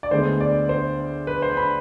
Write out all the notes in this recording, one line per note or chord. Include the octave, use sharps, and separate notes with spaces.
D5
D2 D3 G#3 B3 C5
D5
C5
B4
C5
B5